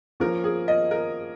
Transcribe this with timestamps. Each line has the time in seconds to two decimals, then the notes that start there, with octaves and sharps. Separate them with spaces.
0.20 F3 A#3 C#4 A#4
0.44 G#4
0.68 D#5
0.91 A#4